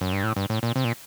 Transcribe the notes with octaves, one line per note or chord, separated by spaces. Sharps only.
F#2
G2
A2
G2
A2
A#2
C3
A#2